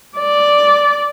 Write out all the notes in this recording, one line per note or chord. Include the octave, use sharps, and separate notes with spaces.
D5